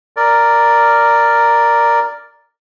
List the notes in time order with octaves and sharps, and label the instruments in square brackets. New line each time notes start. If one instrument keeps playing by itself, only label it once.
[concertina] A#4 D5